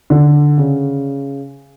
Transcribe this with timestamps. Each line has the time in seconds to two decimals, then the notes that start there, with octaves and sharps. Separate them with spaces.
0.10 D3
0.58 C#3